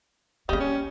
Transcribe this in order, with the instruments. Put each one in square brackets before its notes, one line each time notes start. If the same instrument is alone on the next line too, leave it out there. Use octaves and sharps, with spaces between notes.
[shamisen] C#3 G3 [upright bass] A#3 C4 [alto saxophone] D#5
[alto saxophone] C#4